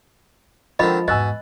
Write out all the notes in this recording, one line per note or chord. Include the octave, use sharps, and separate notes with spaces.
D3 D#3 F3 G#3 C4 D#5 B5
E2 G#2 B2 D#5 G#5 E6 F#6